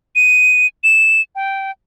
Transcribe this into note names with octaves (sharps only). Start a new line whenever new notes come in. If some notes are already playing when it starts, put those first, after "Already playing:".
D#7
E7
G5